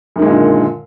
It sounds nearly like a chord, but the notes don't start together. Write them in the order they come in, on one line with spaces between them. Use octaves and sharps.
F#2 D#3 G#3 A#2 D3